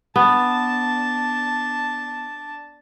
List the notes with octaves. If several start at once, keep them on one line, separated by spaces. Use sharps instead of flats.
B3 D4 A5